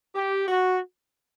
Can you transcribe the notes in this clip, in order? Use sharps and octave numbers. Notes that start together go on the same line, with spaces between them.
G4
F#4